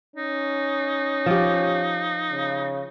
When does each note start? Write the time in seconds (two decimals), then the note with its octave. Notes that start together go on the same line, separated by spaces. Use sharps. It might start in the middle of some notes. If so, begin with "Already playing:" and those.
0.16 C#4 D#4
1.26 F3 G4
2.31 C#3